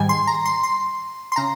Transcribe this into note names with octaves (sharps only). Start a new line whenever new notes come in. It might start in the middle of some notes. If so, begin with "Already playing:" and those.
Already playing: G#2 D#3 G3 G#5
C6
A#5
C6
C6
C6
C#3 A#5